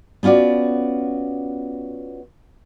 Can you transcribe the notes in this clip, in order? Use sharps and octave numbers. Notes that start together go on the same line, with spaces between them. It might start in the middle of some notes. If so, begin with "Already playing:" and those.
B3 C#4 F4 F#4 D5